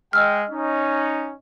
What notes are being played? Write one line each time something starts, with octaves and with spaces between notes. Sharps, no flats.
G#3 D#5 G5 E6 F6
C#4 D#4